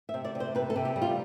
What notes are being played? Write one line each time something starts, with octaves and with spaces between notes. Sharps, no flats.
E5
C3
D5
C3
C5
C3 B4
A4
C3
G4
G3
F4